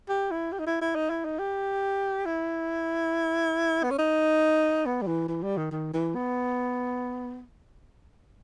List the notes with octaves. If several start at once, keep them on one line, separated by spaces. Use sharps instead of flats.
G4
E4
G4
D#4
E4
E4
D#4
E4
D#4
G4
E4
B3
C#4
D#4
B3
G3
E3
E3
G3
D#3
D#3
E3
B3